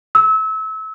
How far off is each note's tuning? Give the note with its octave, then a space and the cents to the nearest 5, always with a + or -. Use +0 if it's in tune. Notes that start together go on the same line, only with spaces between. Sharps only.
E6 -30